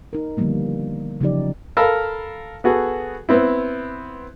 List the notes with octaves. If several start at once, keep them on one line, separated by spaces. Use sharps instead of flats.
D#4 A#4
D3 D#3 F3 G3 A#3 B3
C#3 F3 F#3 D#4 G4 D5
A4 A#4 F5 B5 E6
B3 F#4 G#4 A4
B3 C4 E4